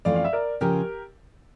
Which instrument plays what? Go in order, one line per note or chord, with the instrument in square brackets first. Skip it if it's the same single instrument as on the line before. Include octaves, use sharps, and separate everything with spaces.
[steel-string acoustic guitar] F2 E3 A3 C#4 F4 [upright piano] D5 F5
[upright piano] F5
E5
A#4 D5
[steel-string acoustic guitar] C#3 F3 C#4 F4 [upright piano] G4 A#4